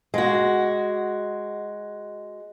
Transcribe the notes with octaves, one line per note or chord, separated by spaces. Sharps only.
G#3 F#4